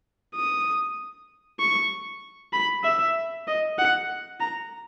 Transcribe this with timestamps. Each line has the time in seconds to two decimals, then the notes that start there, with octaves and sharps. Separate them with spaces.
0.36 D#6
1.60 C#6
2.53 B5
2.84 E5
3.48 D#5
3.79 F#5
4.40 A#5